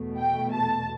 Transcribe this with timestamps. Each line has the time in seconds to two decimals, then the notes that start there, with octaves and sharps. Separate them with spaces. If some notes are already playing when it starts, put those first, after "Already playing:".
Already playing: E2 B2 A3
0.18 G5
0.52 A5